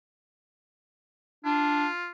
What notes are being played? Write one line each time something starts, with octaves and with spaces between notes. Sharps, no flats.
D4 F4